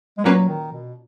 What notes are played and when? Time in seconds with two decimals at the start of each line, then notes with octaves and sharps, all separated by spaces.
0.18 G#3
0.24 A#2 F#3 A#3 C#4 F#4 B4
0.48 D#3
0.72 B2